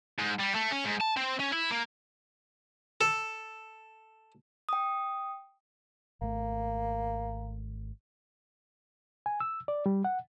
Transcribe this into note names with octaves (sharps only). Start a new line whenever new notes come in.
G#2
G3
A3
C#4
G#2
A5
C4
C#4
E4
A#3
A4
G5 D#6
G#1 A3 A#3
G#5
E6
D5
G3
F#5